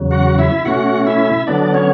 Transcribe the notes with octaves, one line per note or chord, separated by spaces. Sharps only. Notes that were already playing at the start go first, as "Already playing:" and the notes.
Already playing: E2 C#3 F#3
F#4 F#5
E4 E5
B2 A3 C#4 F#4 F#5
E4 E5
D3 F#3 B3 D4 D5
C#4 C#5